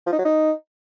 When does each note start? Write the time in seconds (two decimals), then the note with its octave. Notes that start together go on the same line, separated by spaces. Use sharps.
0.06 F3
0.13 D#4
0.19 F#3
0.25 D#4